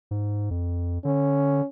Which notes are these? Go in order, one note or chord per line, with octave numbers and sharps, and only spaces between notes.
G#2
F2
D3 C#4